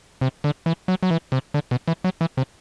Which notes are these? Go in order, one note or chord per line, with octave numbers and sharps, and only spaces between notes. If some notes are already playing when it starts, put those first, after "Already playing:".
C3
D3
E3
F#3
F#3
E3
C3
D3
B2
E3
F#3
E3
C3